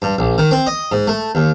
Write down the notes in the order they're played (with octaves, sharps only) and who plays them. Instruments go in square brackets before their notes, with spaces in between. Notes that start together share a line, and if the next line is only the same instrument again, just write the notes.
[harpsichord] G2
A#1
D#3
C4
D#5
G#2
A3
D#2